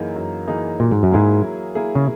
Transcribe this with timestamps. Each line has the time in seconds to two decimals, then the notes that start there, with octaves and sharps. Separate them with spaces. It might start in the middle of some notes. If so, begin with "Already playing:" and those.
Already playing: F#2 E3 A#3 D#4 G#4
0.16 F#2
0.48 E3 A#3 D#4 G#4
0.80 A#2 F#3
0.91 G#2
1.03 F#2
1.11 G#2 A#3 E4 G#4
1.44 F#3
1.75 A#3 E4 G#4
1.95 C#3